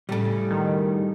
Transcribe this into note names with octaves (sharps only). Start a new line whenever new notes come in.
A2 C#3 G3 A4
D#3